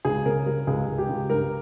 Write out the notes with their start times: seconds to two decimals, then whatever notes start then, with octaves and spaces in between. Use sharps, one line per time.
0.05 C#2 G#4
0.25 C#3 A#4
0.46 G3 A#4
0.67 C#2 G#4
0.88 C#2
0.98 G4
1.09 C#2
1.30 G2 A#4